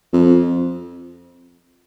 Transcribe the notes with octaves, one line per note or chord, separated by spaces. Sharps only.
F2